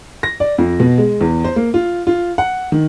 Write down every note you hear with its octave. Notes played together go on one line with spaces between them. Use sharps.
A#6
D5
F2
B2
G#3
E2
C5
A#3
F4
F4
F#5
D#3